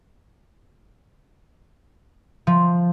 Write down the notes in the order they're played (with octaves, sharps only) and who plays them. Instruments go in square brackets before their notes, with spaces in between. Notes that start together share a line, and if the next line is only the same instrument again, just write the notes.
[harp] F3